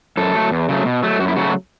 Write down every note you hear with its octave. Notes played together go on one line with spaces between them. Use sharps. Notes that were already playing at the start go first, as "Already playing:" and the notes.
F#2 A4
F#3 A3
E2
C#3 F#3 A3
B2
F#3 A3
F#2 F#4
E4
C#3 F#3 A3 F#4